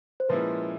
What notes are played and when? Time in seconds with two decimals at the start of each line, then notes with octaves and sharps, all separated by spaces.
0.20 C5
0.29 A#2 F3 G#3 C#4 E4 B4